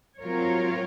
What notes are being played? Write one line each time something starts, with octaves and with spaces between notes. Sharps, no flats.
F#3 C4 F4 A#4 C#5